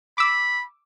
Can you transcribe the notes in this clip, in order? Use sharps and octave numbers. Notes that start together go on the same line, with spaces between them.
B5 D6 E6